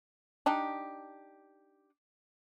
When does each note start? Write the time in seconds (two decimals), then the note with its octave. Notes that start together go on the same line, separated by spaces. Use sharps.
0.46 D4 D#4 G4